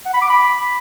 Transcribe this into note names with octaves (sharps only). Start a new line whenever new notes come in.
F#5
B5
D6
B5